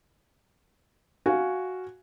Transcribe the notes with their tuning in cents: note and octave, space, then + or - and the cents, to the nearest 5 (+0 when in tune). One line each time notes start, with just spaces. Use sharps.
F#4 +0 F5 -5 G#5 +0